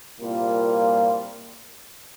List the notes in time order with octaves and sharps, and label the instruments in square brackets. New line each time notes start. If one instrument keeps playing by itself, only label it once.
[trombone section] C2 A#2 G3 A#3 F4